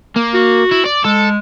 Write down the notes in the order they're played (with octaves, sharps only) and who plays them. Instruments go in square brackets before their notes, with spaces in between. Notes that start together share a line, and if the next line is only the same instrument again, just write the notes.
[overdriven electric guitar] A#3
[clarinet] F#4
[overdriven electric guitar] E4
D5
[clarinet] G#3 [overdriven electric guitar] A4